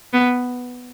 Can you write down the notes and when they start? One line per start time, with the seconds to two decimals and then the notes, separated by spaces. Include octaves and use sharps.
0.13 B3